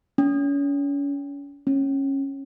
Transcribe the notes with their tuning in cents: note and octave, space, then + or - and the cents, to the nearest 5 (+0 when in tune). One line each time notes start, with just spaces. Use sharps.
C#4 +35
C#4 -20